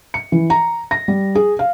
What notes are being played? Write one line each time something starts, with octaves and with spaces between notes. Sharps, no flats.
C#7
E3
A#5
A#6
G3
G#4
F5